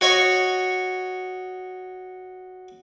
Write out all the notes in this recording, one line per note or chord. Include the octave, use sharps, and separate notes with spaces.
F#4 C#5 D#5 C#6